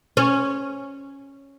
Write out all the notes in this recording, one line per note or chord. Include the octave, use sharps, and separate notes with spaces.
C#4